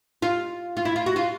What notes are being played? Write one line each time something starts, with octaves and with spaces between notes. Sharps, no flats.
F4
F4
E4
F4
F#4
F4